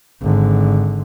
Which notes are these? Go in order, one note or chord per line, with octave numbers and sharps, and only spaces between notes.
G#1 D3